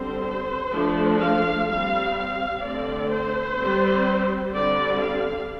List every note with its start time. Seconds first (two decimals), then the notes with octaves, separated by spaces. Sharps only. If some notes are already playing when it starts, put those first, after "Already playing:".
Already playing: D3 G3 C4 C5
0.72 F3 A3 D4
1.20 F5
1.67 G3 C4 F5
2.16 F5
2.62 D3 A3 C4 D5
3.10 C5
3.57 G3 C4
4.52 D3 G3 C4 D5
5.00 F5